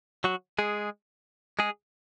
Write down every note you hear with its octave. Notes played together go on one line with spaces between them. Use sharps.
F#3 F#4
G#3 G#4
G#3 G#4